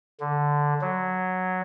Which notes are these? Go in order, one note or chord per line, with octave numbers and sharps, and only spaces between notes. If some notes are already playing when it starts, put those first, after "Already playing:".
D3
F#3